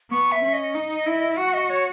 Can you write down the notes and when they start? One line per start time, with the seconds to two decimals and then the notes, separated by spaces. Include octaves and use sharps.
0.11 B3 C#6
0.32 E5
0.43 C#4
0.53 D#5
0.75 D#4
1.06 E4
1.37 F#4 F#5
1.54 D#5
1.70 C#5